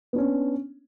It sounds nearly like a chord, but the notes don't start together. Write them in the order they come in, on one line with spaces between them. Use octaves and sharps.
B3 D4 C#4